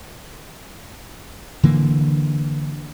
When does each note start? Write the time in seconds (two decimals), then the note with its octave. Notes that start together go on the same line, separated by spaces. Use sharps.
1.63 D3 E3 A#3